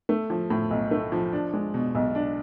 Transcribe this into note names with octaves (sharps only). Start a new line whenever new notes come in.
A3
F3
A2
B1
A3
F3
D4
G#3
B2
B1
D4